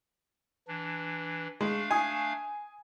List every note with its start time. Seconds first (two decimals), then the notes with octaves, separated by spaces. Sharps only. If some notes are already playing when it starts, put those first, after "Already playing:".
0.68 E3 D4
1.61 G#3 A3 D4 F5
1.91 G#5 D#6